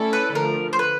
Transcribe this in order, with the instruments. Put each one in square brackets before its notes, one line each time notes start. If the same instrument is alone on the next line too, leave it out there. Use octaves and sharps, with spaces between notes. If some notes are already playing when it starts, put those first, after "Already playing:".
Already playing: [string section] A3 C#4 E4 A4 D5
[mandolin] B4
[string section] D3 F3 A3 [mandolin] A#4
[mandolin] C5
B4